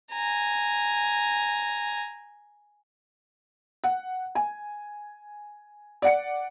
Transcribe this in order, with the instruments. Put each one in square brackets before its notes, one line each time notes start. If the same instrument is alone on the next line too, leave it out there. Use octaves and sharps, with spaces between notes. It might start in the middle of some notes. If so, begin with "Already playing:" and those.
[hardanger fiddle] G#5 A#5
[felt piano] F#5
G#5
D5 F#5 C#7